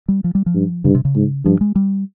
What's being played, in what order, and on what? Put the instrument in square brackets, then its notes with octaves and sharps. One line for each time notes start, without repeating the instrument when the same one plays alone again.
[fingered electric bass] G3
F3
G3
F3
[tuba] G2
[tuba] G2 [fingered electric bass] C#3
[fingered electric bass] C3
C#3
[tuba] G#2
[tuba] G2 [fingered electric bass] F3
[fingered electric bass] G#3
G3